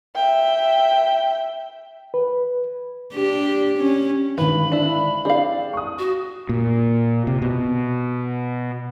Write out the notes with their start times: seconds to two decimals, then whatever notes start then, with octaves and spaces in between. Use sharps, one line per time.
0.16 E5 G5
2.14 B4
3.15 D4 G4
3.78 C#4
4.38 G#1 D3 B4 B5
4.72 D4 E4
5.25 C4 D4 G#4 D5 F5
5.73 C#6 D#6
5.99 F#4
6.49 A#2
7.27 C3
7.42 B2